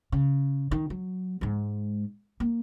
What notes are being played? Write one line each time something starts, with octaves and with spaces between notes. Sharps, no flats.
C#3
D#3
F#3
G#2 G#3
A#3